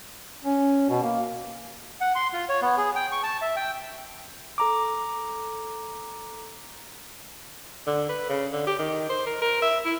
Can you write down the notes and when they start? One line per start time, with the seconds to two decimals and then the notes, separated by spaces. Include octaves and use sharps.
0.44 C#4
0.89 B2
1.03 A#3
2.01 F#5
2.15 C6
2.33 F4
2.49 C#5
2.62 B3
2.78 G#4
2.96 G5
3.12 C#6
3.23 A5
3.42 E5
3.56 G5
4.58 A4 A#5 D6
7.87 D3
8.09 B4
8.29 C#3
8.52 D3
8.67 G4
8.79 D#3
9.09 C5
9.26 A#4
9.42 A#4
9.62 E5
9.85 E4